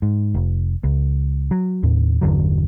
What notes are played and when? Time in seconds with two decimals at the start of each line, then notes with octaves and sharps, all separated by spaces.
0.02 G#2
0.34 F1
0.84 C#2
1.51 F#3
1.83 D#2 A2
2.21 G1 E2 D3 F#3